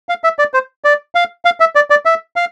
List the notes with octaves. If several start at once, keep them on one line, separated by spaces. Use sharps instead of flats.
F5
E5
D5
C5
D5
F5
F5
E5
D5
D5
E5
F5